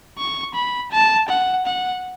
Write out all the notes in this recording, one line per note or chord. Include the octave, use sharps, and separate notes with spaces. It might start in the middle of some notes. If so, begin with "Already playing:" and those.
C#6
B5
A5
F#5
F#5